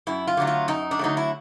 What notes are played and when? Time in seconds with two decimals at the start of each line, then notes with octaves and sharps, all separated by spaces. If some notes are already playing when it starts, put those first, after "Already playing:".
0.07 F#2 E4
0.27 F4
0.37 D3 F#3 A3
0.47 F4
0.68 F#2 D#4
0.91 D4
0.99 D3 F#3 A3 D#4
1.17 E4